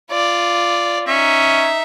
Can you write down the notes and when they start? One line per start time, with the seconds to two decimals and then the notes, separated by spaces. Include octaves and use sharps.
0.11 F4 D5
1.08 C#4 D#4 E5